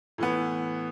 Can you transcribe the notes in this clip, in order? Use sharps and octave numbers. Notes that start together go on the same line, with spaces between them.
A2 E3 B3